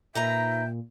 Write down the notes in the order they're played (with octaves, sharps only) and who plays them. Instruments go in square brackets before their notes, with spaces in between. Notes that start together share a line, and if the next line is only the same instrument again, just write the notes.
[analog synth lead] A#2 [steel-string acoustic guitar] D#4 B4 A#5 [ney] E5 [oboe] G5